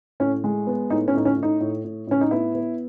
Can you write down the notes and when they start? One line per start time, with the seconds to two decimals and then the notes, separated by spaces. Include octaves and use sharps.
0.20 A2 C#4
0.44 G#3
0.67 B3
0.90 A2 D#4
1.08 C#4
1.14 A2 D#4
1.25 C#4
1.37 A2
1.43 D#4
1.60 A2
1.84 A2
2.07 A2 C#4
2.21 D#4
2.31 B3 E4
2.55 B3